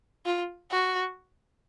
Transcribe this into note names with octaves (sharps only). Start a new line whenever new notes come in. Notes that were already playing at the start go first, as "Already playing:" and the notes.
F4
F#4